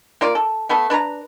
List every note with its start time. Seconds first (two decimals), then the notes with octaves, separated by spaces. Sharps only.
0.21 A#3 F4 D5
0.35 A4
0.69 A3 B3 A4
0.90 D4 B4 C#5 A#5